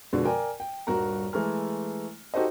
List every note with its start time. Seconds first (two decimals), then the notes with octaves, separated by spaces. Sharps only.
0.13 B2 D3 F3 G#3
0.25 A#4 D5 G5 G#5
0.60 G5
0.87 D#1 G2 F#4 A#4 A#5
1.33 E3 G#3 A3 A#5 F6
2.34 D#4 F#4 G4 A4 C5 D#5